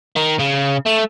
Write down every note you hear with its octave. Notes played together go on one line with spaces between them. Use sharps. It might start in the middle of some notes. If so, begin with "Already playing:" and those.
D#3
C#3
A3